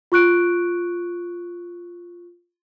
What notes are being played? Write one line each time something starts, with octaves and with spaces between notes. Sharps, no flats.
F4 C#6 F#6 D7